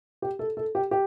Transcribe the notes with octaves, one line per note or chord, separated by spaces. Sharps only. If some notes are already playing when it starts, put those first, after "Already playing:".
G4
A4
A4
G4
G4